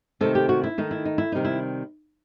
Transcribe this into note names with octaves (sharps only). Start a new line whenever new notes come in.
C3 D#3 A3 A4
G4
F#4
E4
D#3 A3 D#4
E4
D#4
E4
C3 D#3 G3 D#4
E4